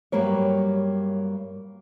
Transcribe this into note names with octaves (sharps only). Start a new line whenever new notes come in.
G2 F#3 G3 A#3 C#5